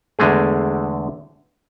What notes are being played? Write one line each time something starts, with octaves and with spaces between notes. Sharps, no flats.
E2 D3 G#3 A3 G#4